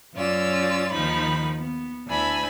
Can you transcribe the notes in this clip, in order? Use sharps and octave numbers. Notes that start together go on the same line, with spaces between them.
F#2 C#4 F4 D5 E6
D#2 D#3 F3 D#4 B5
B3
D2 D4 E4 G#5 B5 E6